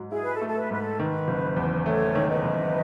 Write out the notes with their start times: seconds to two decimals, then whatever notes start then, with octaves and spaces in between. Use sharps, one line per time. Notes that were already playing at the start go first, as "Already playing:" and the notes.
Already playing: G#2 F#3
0.12 E4 G#4
0.23 B4
0.34 A4
0.41 A3
0.47 A4
0.56 B4
0.71 G#2 B4
0.78 A4
0.98 D#3 B4
1.28 F#1
1.57 E2
1.86 A3 A4 C#5
2.15 D#3
2.29 B4 D#5
2.44 F#1